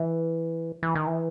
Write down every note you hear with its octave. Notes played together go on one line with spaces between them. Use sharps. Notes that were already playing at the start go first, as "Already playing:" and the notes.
Already playing: E3
E3
D#3
E3